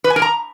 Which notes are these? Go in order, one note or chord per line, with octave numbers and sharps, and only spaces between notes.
B4
G#5
A#4
A#5